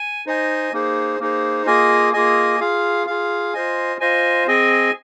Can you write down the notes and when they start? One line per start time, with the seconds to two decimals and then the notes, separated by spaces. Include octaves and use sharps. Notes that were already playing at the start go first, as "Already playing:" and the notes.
Already playing: G#5
0.26 D#4 C5 D#5 G#5
0.73 A#3 D#4 G#4 C5
1.19 A#3 D#4 G#4 C5
1.66 A#3 F4 G#4 D#5 G#5
2.13 A#3 F4 G#4 D#5 G#5
2.60 F4 G#4 F5
3.07 F4 G#4 F5
3.54 F4 C5 D#5 G#5
4.00 F4 C5 D#5 G#5
4.48 C4 G#4 D#5 G#5